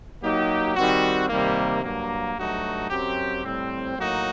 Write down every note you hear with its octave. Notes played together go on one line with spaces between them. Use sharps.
F#3 A#3 D#4 G4
D#3 G3 C4 F#4
C3 D#3 G3 A#3
G2 F#3 A#3
G2 F#3 A3 D#4 F#4
F#2 F#3 C4 G4
A2 G3 C4
A2 F#3 A#3 D#4 F#4